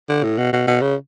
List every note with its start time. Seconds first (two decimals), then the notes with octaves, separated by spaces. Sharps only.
0.09 D3
0.24 A2
0.38 B2
0.53 B2
0.67 B2
0.82 C#3